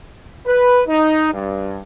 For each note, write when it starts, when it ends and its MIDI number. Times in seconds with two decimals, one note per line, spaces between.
0.45 0.81 71
0.87 1.29 63
1.33 1.83 43